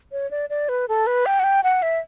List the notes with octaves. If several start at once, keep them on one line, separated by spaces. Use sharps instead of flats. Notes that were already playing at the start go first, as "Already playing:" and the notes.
C#5
D5
D5
B4
A4
B4
G5
F#5
G5
F#5
E5